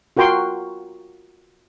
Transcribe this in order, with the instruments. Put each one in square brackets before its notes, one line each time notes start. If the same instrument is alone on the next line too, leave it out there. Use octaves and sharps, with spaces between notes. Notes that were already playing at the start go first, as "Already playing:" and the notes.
[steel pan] F4 F#4 A#4 G5 C6 C#6